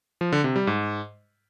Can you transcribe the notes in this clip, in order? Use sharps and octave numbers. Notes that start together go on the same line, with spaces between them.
F3
D3
C3
G3
G#2